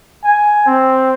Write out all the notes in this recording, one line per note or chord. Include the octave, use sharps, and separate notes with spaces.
G#5
C4